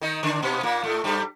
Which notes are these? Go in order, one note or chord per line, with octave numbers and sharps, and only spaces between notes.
D#3 D#4
D3 D4
B2 B3
A#2 A#3
A2 A3
G2 G3